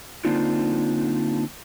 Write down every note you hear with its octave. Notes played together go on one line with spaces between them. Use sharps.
D3 A#3 C4 D4 D#4 F4